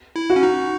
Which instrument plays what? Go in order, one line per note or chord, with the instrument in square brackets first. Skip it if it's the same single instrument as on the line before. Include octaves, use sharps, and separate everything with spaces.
[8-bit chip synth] E4
[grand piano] F#4
[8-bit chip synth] C#4
D#4